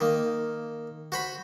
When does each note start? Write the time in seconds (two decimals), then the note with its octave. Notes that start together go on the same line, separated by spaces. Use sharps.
0.01 D#3 A#3
1.12 F#4 C5 B5